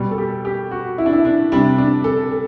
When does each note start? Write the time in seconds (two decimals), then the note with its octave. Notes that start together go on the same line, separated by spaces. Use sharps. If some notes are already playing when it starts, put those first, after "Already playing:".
Already playing: B2 G3
0.11 A4
0.18 G4
0.45 G4
0.71 F#4
0.98 E4
1.06 D4
1.13 E4
1.25 D4
1.52 C3 G3 D4
1.78 D4
2.04 A4
2.32 A4